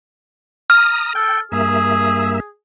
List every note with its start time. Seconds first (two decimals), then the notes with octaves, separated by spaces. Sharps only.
0.70 A#5 D#6 F6
1.15 A4 G5
1.52 G2 A#3 G#4 E5